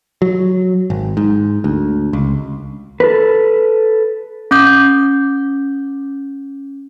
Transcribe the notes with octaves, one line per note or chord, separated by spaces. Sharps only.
F#3
G#1
G#2
D2
C#2
A4 B4
C#4 D6 G6